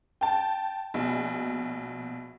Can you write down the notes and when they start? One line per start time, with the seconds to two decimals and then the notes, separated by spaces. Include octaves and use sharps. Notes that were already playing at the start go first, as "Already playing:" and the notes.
0.21 G5 A5
0.94 A#1 B2